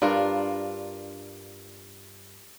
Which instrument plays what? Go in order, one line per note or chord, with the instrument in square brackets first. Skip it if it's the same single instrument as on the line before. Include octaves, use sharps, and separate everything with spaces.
[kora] G2 D4 F4 A#4